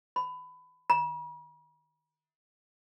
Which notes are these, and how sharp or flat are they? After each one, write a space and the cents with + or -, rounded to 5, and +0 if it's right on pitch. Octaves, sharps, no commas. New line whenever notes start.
B5 +25
B5 -45